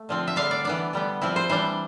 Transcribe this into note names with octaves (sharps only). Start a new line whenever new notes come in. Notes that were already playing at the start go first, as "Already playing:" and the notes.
Already playing: A3
D3 F3 C4
E5
D3 G3 D4 F5
D5
E3 B3 D4 D5
D3 G3 B3
F3 C4 E4
C5
E3 G3 D4 C5